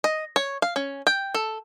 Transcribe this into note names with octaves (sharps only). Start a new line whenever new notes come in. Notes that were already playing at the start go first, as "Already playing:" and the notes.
D#5
C#5
F5
C#4
G5
A4